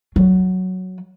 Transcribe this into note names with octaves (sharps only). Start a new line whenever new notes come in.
F#3